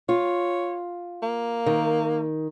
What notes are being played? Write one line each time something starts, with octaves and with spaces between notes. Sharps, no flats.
F4 C#5
A#3
D#3